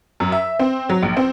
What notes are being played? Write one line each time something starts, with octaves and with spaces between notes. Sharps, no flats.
F#2
E5
C4
F#3
A#1
C4